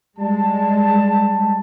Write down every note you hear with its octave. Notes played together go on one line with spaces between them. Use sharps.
G3 G#3 A5